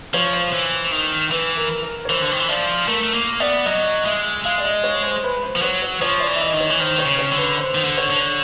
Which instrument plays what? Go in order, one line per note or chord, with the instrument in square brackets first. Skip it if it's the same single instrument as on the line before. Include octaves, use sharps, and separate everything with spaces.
[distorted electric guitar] F3 [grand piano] C#5
[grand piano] C5
[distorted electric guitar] E3
D#3
[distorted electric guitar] E3 [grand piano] B4
[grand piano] A#4
A#4
C#5
[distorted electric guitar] E3 [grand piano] C5
[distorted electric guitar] D3
D#3
E3
[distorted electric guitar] F3 [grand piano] D5
[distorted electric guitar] A3 [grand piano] A#4
[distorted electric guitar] A3
A#3
[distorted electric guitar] B3 [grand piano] D5
[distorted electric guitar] F#3 [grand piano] D#5
[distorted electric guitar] G#3 [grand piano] E5
[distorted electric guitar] G#3 [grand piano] F5
[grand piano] D5
D#5
C#5
C5
B4
C5
[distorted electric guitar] F3
[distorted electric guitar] F#3 [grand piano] C#5
[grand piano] C#5
[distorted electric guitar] F3 [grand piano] C#5
[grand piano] D5
[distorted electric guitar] E3
[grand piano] E5
D#5
[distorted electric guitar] D#3
[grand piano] C#5
[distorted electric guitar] E3
[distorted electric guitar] D#3 [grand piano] C5
[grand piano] C#5
[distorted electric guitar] C#3
[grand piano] C#5
[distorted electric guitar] D3
[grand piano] B4
C5
[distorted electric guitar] D#3
D3
[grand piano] C#5
[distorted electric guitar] D3